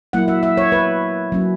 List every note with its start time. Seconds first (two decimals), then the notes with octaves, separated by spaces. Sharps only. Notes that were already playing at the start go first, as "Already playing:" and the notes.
0.13 F#3 A#3 E4 F#5
0.28 E5
0.43 E5
0.57 C#5
0.72 B4
1.32 F#3 A#3 C#4